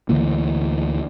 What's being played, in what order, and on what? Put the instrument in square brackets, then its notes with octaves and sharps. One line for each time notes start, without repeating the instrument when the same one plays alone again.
[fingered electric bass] D2 D3 E3 A#3